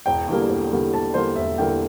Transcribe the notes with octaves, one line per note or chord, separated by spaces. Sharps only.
E1 G5
E2 D3 G3 A#3
E1
E2 D3 G3 A#3
E1 A5
E2 D3 G3 A#3 C5
E1 E5
E2 D3 G3 A#3 G5